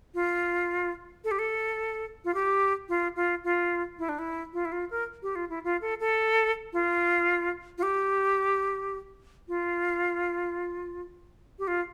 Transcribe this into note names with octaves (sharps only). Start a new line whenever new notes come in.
F4
A4
G4
A4
F4
G4
F4
F4
F4
E4
D4
E4
F4
E4
F4
A#4
G4
F4
E4
F4
A4
A4
F4
F4
G4
F4
G4
F4